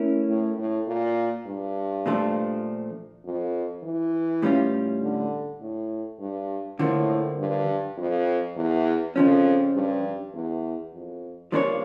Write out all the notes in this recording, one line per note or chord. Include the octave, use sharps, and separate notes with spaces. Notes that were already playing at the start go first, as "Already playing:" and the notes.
Already playing: A3 C#4 E4 A#4
A2
A2
A#2
G2
A#2 F3 A3 D4 A4
F2
E3
A2 G3 C#4 F4
D3
A2
G2
A2 D3 F3 A#3
G2
F2
E2
F2 C#3 F3 C#4
G2
E2
F2
G2 F3 A#3 D4 A4 C#5